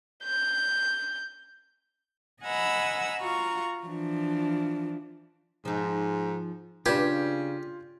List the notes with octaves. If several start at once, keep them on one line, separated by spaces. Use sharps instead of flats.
G6
D#5 F#5 G#5 A#5 B5 E6
F4 F#4 F5 A#5 C#6
E3 F3 D4
G#2 F3 D#4
C#3 D4 F4 G4 B4 G6 G#6